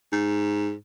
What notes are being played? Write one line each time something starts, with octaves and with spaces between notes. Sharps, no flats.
G#2